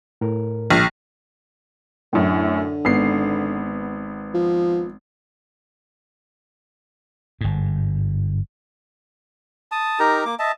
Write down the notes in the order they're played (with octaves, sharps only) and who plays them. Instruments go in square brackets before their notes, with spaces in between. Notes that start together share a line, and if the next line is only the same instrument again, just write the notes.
[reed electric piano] A2 A#4
[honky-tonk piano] A#1
[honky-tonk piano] F#2 A2 [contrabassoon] D3
[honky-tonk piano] G#1 B3 C7
[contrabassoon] F3
[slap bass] G1 G#2
[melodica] A5 D#6
D#4 G4 A#4 A#5
A#3 D6
D#5 E5 A5